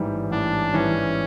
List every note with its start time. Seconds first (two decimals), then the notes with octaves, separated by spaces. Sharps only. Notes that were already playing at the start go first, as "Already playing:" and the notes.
Already playing: A1 G#2 E3 G3
0.31 A1 D4
0.73 G#2 E3 G3 C#4